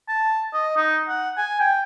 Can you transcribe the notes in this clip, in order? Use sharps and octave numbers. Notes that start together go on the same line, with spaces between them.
A5
D#5
D#4
F#5
G#5
G5